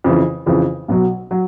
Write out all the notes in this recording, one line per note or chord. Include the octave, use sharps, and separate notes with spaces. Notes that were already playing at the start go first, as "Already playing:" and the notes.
F2 C#3 E3
F2 C#3 E3
B1 B2 F#3
F#3